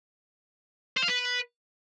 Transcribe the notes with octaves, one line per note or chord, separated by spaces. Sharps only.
C5
F5
B4